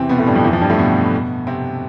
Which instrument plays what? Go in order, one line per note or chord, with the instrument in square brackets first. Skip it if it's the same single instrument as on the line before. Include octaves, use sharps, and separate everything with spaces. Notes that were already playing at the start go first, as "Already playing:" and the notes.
Already playing: [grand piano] E2 C3 E3 C4
B2 B3
A2 A3
G2 G3
F2 F3
E2 E3
F2 F3
G2 G3
A2 A3
B2 B3
C3 C4